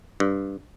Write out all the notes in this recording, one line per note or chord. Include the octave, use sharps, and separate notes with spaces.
G2